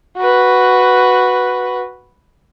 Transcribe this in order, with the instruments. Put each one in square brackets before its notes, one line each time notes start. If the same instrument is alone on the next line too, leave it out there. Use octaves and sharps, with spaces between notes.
[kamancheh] F#4 B4